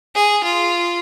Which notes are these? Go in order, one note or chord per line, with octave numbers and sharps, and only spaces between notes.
G#4
F4